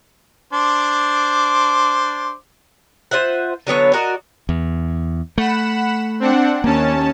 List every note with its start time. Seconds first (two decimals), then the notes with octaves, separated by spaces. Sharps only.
0.53 D4 C5 D6
3.11 F4 C5 E5 F#5
3.67 D3 F#3 B3 C#5
3.94 F#4 A#4 D5 D#5
4.49 E2
5.38 A3 F#5 B5 E7
6.20 C4 D4 F#5
6.64 D#2 A#3 C#4 A5